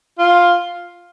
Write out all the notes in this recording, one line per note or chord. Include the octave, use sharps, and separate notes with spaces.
F4